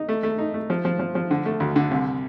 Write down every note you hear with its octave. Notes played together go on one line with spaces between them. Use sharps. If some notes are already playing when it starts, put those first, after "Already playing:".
Already playing: D#4
A3
A3
D#4
A3
F3
F3
F3
F3
D3
A3
D2
D3
C2